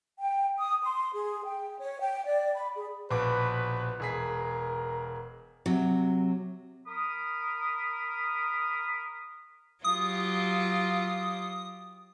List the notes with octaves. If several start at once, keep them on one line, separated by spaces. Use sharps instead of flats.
G5
D#6
C6
G#4
G5
C#5
G5
D5
B5
G#4
A#1 B2 B4 D6
E1 G#4 A#4 B6
C3 F#3
A#4 B5 D#6
F#3 F4 G4 D#6